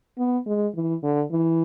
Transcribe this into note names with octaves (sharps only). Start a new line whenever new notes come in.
B3
G#3
E3
D3
E3